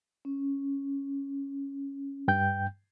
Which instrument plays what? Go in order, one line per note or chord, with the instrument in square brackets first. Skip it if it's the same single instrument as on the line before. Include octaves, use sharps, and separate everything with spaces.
[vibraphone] C#4
[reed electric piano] G2 G5 G6